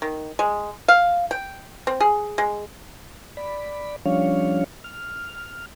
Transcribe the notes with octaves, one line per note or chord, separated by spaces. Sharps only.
D#3
G#3
F5
G5
C4
G#4
G#3
D5 B5
F3 G3 C#4 D4 C#5 F5
F6